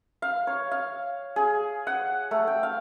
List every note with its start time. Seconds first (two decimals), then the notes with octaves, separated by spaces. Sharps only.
0.22 F5
0.47 C#5
0.71 F5
1.36 G#4
1.87 F#5
2.31 A3
2.47 G5
2.63 F5